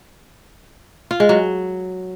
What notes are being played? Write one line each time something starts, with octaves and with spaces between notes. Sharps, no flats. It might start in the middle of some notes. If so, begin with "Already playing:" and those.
F4
G#3
F#3